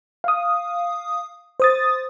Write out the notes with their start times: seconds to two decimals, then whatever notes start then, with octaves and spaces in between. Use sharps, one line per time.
0.24 F5 D#6
1.60 C5 D#6 A6